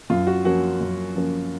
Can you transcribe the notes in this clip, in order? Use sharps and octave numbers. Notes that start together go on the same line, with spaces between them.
F#2 F4
F#4
F3 A#3 C#4 F#4
F#2
F3 A#3 C#4